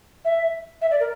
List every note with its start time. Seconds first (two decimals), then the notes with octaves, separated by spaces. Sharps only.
0.25 E5
0.81 E5
0.91 D5
1.00 A#4